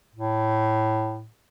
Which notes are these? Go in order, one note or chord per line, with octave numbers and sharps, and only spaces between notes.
A2